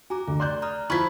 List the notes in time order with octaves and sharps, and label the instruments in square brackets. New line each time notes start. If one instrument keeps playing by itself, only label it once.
[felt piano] F#4 [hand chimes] G#5 A#5 D6
[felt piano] D2 [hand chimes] A3
[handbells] D5 [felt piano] C6 F#6 G6
[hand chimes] A#5 D#6 F6
[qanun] F3 E4 [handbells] B5 [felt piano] C#6 G#6 B6